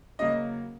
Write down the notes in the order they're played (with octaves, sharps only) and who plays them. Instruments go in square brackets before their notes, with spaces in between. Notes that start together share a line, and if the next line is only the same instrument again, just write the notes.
[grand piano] C#3 F#3 A#3 D#5